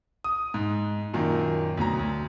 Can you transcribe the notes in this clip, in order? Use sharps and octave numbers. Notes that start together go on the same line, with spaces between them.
D#6
G#2
F#2 A#2 D#3
D2 B2 F#3 A#5
D2